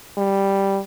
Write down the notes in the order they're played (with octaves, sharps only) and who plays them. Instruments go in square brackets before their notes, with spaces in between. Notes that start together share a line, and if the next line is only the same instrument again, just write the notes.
[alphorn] G3